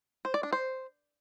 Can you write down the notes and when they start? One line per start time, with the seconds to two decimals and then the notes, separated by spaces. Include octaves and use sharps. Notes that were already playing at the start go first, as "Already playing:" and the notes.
0.25 C5
0.34 D5
0.43 D4
0.53 C5